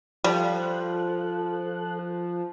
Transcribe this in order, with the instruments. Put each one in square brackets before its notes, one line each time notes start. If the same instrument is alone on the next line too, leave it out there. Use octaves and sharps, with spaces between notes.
[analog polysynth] F3 [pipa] G3 [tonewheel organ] F4 A4 F#6